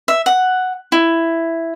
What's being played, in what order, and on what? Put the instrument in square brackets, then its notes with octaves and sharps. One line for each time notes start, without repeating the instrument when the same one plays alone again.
[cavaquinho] E5
F#5
E4